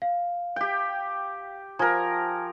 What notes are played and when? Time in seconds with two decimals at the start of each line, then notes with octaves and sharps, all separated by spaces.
0.02 F5
0.56 G4 G5
1.79 F3 A#4 G#5 A#5 G#6